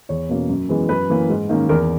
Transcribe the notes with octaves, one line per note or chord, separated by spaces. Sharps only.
E2 C#5
B2 A#3 C#4
F#2
E3 G#3 B3
F#2 B4
E3 A#3 C#4
G#2
D#3 A#3 C#4
E2 A#4